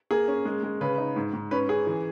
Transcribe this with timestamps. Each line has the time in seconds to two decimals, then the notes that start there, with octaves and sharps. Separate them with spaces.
0.11 A#3 G#4
0.28 C#4
0.45 G#3
0.63 G#3
0.81 C#3 B4
0.98 D#4
1.16 G#2
1.33 G#2
1.51 C#4 B4
1.69 C#4 G#4
1.87 E3